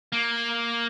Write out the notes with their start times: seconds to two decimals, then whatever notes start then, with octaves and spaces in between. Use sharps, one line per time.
0.12 A#3